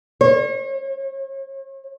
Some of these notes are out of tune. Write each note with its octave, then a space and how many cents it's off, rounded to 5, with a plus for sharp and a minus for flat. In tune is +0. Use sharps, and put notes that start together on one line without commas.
C#5 -45